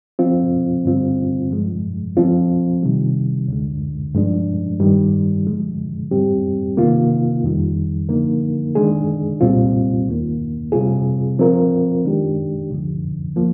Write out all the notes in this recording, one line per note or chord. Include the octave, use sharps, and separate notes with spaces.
F3 C4 F4
G2 D3 G3 C4 F4
G2 F3 G#3
F3 C4 F4
C3 D#3 G3
D2 D3 G#3
G2 F3 G#3 D4
G2 D#3 G3
D3 F3 G#3
G#2 G3 C4 G4
C3 D#3 A#3 F4
F2 D#3 G3
D3 F3 A#3 D#4 A#4
D#3 G#3 D4 G#4
C2 A#2 G3 C4 F4
D#2 D#3 A#3
C3 G3 C4 F4 G#4
F3 C4 F4 A#4
D#3 G#3 D4 G4
D2 D3 F3
F3 A#3